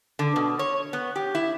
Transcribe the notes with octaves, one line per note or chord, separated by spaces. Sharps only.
D3
B2
C#5
B3
G4
E4